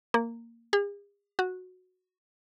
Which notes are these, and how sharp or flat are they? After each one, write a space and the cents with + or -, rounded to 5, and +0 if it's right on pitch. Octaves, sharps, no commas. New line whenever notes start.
A#3 -10
G#4 -45
F#4 -10